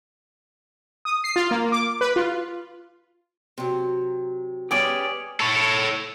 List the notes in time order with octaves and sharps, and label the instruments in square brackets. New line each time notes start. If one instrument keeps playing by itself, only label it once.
[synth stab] D#6
C7
F4
A#3
D6
B4
F4
[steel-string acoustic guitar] C3 F#3
[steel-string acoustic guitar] B3 C#4 C#5 [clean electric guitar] G4 G#4 D5
[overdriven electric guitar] A4 C#5